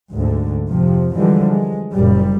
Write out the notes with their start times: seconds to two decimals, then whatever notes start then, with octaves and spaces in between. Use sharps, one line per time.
0.13 D2 G#2 D3
0.69 F2 C3 F3
1.15 D3 E3 F3 G3 G#3
1.49 G#3
1.91 F#1 A#2 G3